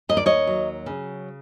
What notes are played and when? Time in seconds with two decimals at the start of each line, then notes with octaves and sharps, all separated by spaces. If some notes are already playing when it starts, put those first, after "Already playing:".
0.09 D#2 D#5
0.17 D5
0.26 C#5 D#5
0.47 F#3
0.86 C#3